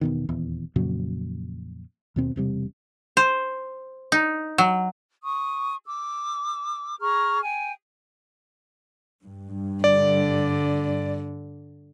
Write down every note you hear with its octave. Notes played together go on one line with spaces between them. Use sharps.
E1 B2 D#3
D#1 E2
F2 A#2 C#3 F#3
D#2 B2 C4
E1 C3 G3
C5
D#4
F#3
C#6 D#6
D6 E6
G#4 A#5 C#6 F6
G5 G#5
G2
D3 D5